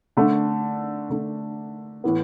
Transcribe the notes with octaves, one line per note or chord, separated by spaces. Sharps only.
D3 A3 D4
D3 A3 D4
A2 E3 B3